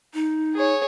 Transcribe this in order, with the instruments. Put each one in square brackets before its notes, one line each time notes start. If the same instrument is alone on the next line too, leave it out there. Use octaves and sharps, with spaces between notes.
[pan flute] D#4
[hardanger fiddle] G#4 C#5